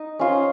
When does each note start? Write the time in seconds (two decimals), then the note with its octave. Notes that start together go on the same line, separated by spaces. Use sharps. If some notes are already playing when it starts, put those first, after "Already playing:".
Already playing: D#4 D#5
0.19 C#4 F4 C5